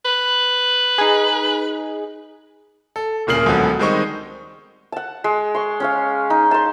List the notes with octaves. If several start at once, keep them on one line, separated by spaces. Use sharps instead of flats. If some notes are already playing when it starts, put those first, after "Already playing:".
B4
D#4 G#4
A4
D1 A#2 C#3 A#3 C7 F#7
C#2 D3 F3 F#3 B3
D#3 G3 G#3 C4 D#4 C#6
F#5 A5
G#3
C6 C#6
C#4 C#5 F5
D#4
A5 C6